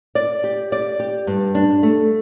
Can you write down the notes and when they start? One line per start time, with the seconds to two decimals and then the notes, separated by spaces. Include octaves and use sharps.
0.15 D5
0.44 G4
0.72 D5
1.00 G4
1.27 G2
1.55 D4
1.83 A3